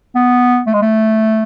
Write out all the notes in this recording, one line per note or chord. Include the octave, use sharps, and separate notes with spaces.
B3
A3
G#3
A3